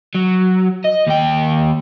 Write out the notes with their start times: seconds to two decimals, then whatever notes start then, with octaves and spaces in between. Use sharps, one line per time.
0.15 F#3
0.84 D#5
1.07 D#2 G5